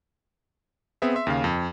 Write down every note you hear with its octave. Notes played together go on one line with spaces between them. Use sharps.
B3 C4 G#4 E5
E5 C6
D#2 C#3 F5
F2